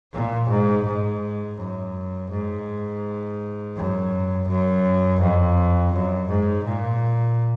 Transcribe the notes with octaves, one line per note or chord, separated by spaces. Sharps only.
A#2
G#2
G#2
F#2
G#2
F#2
F#2
F2
F#2
G#2
A#2